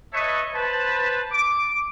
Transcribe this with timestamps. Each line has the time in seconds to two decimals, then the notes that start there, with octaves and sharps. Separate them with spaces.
0.13 B4 C#5 D#5 E5 A5 C#6
0.55 B4 C5 A5
1.31 D6